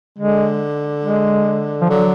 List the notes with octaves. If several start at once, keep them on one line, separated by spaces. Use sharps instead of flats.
D3 G#3
G#3
F3
D3 F#3